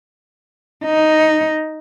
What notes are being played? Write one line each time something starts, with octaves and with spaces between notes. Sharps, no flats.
D#4